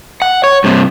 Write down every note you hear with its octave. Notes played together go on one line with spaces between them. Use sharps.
F#5
C#5
G2 C3